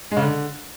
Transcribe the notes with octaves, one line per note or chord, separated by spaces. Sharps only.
G#3
C#3
D3